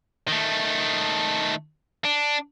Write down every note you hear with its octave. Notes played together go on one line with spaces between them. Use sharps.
D#3 A3
D4